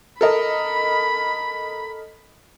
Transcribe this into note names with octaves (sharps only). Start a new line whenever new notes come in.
A4 A#4 D#5 B5